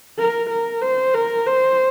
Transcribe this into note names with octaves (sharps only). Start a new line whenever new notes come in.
A#4
A#4
C5
A#4
C5